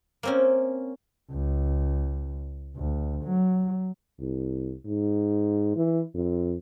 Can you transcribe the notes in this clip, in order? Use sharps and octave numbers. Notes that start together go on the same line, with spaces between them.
A#3 C4 C#4
C#2
D2
F#3
C2
G#2
E3
F2